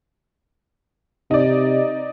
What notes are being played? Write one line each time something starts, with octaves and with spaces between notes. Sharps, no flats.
C3 D#4 D5